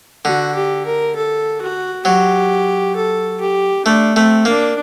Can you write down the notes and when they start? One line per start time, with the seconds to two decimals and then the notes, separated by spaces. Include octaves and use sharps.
0.25 D3 F#4
0.55 G4
0.86 A#4
1.16 A4
1.61 F#4
2.05 F#3 G4
2.95 A4
3.41 G4
3.86 A3 D4
4.15 A3 C4
4.45 A#3 D4